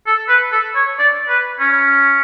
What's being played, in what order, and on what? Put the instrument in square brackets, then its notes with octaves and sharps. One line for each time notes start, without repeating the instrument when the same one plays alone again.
[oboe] A4
B4
A4
C#5
D5
B4
C#4